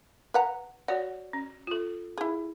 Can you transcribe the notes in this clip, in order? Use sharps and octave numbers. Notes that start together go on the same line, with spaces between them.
B4 F#5 A#5
F#4 C#5 D5 F#5
C#4
F4 A4
E4 G#4